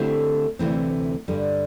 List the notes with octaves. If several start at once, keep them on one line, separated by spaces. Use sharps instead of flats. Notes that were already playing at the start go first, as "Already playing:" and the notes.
Already playing: D3 A3 C4 E4 G4
D2 C3 E3 A3 C4
G2 D3 G3